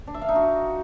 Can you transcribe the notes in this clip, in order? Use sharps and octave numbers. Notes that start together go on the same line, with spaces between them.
D4
E5
F5
D#4
F#4